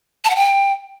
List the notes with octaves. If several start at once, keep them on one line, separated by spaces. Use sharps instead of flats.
A5
F#5
G5